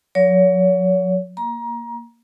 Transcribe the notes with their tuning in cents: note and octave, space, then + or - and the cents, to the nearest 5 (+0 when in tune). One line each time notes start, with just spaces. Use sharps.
F#3 -40 C#5 +35
A#3 +0 A#5 +25